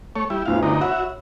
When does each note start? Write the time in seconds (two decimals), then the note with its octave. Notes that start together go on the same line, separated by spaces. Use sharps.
0.16 A3 C#5
0.30 G3 E4
0.46 G1 D2 E4 F5
0.63 D3 D#4 A#4
0.81 F#4 C#5 E5 F#5 B5